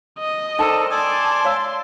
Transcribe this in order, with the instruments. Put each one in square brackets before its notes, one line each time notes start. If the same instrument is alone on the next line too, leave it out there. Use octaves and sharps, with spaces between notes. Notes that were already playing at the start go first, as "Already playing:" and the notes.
[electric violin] D#5
[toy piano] D#4 G5 A5 [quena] A4 [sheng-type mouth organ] A#4 C5 D5
[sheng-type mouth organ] D5 G#5 D6 [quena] A5 [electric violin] C6 [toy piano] E6
[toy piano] C#5 F5 E6